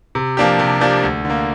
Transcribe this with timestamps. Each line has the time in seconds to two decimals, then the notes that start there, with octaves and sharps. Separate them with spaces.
0.15 C3
0.37 F3 A#3 D4 G4
0.59 C3
0.81 F3 A#3 D4 G4
1.03 D2
1.25 D3 A#3